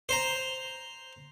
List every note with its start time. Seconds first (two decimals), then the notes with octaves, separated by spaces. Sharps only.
0.09 C5 A#5